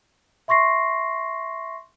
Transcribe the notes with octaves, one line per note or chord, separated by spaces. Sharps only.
E5 C6 C#6 A#6 C7